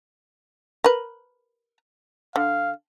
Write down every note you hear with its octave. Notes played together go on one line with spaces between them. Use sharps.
A#4 B4
D3 F5